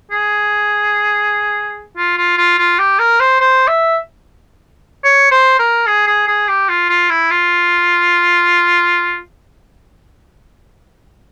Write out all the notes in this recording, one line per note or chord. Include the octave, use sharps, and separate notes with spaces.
G#4
F4
F4
F4
F4
G4
A#4
C5
C5
E5
C#5
C5
A#4
G#4
G#4
G#4
G4
F4
F4
E4
F4